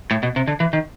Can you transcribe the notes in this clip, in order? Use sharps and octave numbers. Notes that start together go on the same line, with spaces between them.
A2
B2
C3
D3
E3
D#3